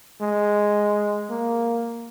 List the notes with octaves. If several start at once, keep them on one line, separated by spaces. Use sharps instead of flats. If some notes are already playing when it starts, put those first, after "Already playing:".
G#3
A#3